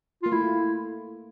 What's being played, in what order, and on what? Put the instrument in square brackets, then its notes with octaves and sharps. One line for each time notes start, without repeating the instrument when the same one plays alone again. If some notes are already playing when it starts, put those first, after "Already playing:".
[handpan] A#3 [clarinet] F4
[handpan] A3 [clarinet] E4